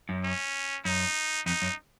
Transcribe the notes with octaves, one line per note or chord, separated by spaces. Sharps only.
F#2
C#4
F#2 D#4
F2 D#4
F#2